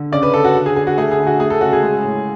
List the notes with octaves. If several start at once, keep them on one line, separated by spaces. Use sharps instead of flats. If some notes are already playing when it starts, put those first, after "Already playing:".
Already playing: D3
C#3 D5
B4
C#3 A4
F#4
D3
G#4
D3 G#4
F#4
A3 G#4
G#4
D3
F#4
A3 G#4
A4
C#3 F#4
G#4
G#3
A2